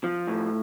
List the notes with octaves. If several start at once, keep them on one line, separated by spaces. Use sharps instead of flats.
F3
A2